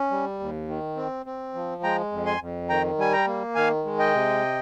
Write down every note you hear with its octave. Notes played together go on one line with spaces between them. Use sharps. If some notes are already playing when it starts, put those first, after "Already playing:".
Already playing: C#4
G3
D#2
D#3
C4
C4
F3
G#3 G5 A#5
F2
G#5 C6
F2
D#3 G5 A#5
G3 G#5
G5 A#5
A#3
D#3 F5 G#5
G#3
D#5 G5
C3